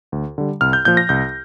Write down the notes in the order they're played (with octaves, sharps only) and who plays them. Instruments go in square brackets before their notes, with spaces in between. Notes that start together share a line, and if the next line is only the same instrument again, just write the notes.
[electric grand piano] D2
D3 G3
C2 F6
G6
A#2 F3 G6
A#6
C2 G6